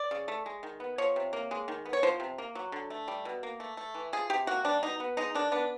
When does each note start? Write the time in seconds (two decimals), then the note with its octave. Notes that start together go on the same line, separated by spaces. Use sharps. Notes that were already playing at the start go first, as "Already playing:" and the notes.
Already playing: D5
0.11 C#3
0.28 A3
0.46 G#3
0.63 D#3
0.80 B3
0.98 F3 C#5
1.16 C3
1.33 A#3
1.51 G#3
1.68 D#3
1.85 B3
1.93 C#5
2.03 F3 C5
2.20 C3
2.38 A#3
2.55 F#3
2.72 D3
2.90 A3
3.08 G3
3.25 B2
3.43 A#3
3.60 A3
3.77 A3
3.95 E3
4.13 F3 G#4
4.30 C3 G4
4.47 A#3 F#4
4.65 G3 D4
4.83 B2 D#4
5.00 B3
5.17 G#3 D#4
5.35 D#3 D4
5.52 B3 D4